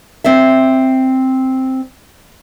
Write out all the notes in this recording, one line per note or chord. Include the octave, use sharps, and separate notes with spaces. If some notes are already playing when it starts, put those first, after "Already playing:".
C4 D5 E5